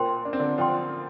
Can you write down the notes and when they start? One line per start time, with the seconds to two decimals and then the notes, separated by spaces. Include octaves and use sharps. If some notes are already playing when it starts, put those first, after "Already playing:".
Already playing: A#2 A#3 C5 G5 C6
0.25 D4
0.33 C4
0.39 D3 D4
0.58 F3 F4 C5 G5 C6